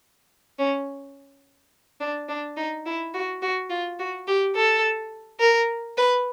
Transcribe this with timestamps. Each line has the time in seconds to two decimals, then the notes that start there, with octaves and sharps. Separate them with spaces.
0.59 C#4
2.00 D4
2.29 D4
2.57 D#4
2.86 E4
3.14 F#4
3.42 F#4
3.70 F4
3.99 F#4
4.27 G4
4.56 A4
5.40 A#4
5.97 B4